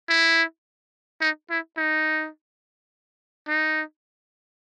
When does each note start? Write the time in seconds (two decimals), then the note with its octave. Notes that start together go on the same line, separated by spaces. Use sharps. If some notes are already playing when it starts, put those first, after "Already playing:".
0.09 E4
1.21 D#4
1.50 E4
1.78 D#4
3.48 D#4